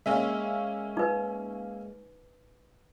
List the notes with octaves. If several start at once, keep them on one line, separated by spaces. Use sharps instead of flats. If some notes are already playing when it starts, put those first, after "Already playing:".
G#3 A#3 C#4 E5
D#4 B4